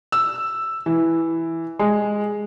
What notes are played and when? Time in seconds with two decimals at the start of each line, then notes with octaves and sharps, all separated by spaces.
0.12 E6
0.86 E3
1.79 G#3